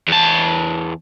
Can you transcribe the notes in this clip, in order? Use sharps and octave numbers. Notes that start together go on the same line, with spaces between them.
E2 A5